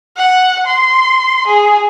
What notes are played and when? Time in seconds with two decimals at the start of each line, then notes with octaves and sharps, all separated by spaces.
0.17 F#5
0.67 C6
1.48 G#4